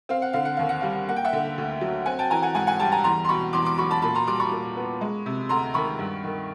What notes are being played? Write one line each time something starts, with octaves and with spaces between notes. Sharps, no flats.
C4 F5
F#5
D3 F5
F#5
D#2 F5
F#5
G3 F5
A#3 F#5
G5
E5 F#5
D3
D2
F#3
C4 F#5 G#5
G5 A5
E3 G#5 A#5
F#5 G#5
G#2 F#5 G#5
F#5 G#5
G3 G5 A5
G#5 A#5
E2 A#5 C6
C6
B2 B5 C#6
E2 C6 D6
C6 D6
F#3 B5 C#6
A5 B5
A#2 A5 B5
A#5 C6
G3 C6 D6
B5 C#6
A#2
B3
G#3
C3
D2 A#5 C6
D#3 B5 C#6
G2
D#3